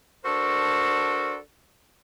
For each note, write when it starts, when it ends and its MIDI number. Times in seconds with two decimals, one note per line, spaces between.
0.25 1.37 62
0.25 1.37 66
0.25 1.37 69
0.25 1.37 70
0.25 1.37 72